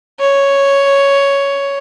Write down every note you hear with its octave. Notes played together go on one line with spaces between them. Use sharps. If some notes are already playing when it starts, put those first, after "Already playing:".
C#5